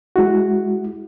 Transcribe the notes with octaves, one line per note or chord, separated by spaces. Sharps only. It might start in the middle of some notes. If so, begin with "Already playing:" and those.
G#3 E4 F#4